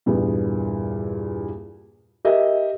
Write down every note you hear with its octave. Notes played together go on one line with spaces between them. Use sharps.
E2 G2 A#2 B3
G4 A#4 D#5 E5